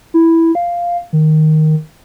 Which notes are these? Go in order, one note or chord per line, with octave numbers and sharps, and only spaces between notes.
E4
F5
D#3